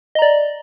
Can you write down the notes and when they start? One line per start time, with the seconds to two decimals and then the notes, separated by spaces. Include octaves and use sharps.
0.15 D#5
0.19 A#5
0.22 D5